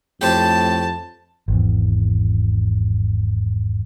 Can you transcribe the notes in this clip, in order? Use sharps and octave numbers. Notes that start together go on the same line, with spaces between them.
F2 A2 G4 C5 A5
G#1 E2